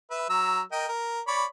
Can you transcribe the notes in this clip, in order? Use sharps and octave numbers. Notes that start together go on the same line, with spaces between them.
B4 E5
F#3 A#5 E6
A#4 D#5 G5
A#4
C#5 D5 B5